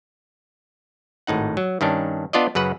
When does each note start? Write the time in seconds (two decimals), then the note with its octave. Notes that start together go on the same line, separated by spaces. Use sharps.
1.27 G#1 A2 D#4 F#5
1.57 F#3
1.81 G2 D#3 C#4 D4
2.33 B3 D4 F4 D5 D#5
2.55 F#2 C#3 B4 F#5